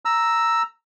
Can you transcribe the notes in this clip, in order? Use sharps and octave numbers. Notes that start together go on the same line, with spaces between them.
A#5 E6